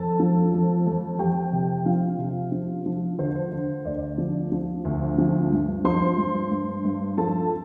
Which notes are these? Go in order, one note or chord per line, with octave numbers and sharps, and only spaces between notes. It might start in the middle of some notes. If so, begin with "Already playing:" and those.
Already playing: F2 A4 A5
F3
F2
F2
F2 G4 G5
C3
F3 F4 F5
C3
F3
F3
D3 C5
D3
D2 D5
F3
F3
D2
F3
G2
F3 C5 C6
G2
G2
G2
F3 A4 A5